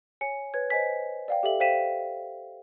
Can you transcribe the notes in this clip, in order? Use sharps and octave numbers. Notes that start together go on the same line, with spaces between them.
C#5 G#5 C#7
B4 C#5 G#6
C5 D#5 G#5 B6
D5 F5 G5
G4 A4 E5 F#7
C5 F5 G5 B6 D#7 E7